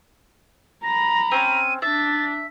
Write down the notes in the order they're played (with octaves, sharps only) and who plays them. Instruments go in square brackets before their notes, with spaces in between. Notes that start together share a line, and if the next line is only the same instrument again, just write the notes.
[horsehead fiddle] A#5 B5 [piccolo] A#6
[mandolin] C4 C#4 [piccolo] D#7
[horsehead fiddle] D4 [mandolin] E5 [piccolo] A6